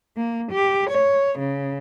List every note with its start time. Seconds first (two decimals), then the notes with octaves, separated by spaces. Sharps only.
0.17 A#3
0.52 G4
0.90 C#5
1.39 C#3